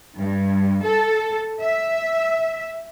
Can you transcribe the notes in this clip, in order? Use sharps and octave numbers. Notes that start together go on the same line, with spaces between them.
G2
A4
E5